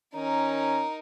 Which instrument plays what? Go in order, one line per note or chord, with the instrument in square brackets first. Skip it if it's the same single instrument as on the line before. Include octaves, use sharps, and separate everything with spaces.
[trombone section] D#3 C#4 [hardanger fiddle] D#4 A#4